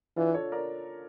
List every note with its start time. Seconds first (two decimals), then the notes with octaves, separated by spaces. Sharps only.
0.17 E3 D4 F4
0.34 A4 C#5
0.52 A#4 D5